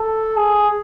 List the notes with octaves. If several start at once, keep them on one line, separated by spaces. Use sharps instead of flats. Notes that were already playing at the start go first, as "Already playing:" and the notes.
Already playing: A4
G#4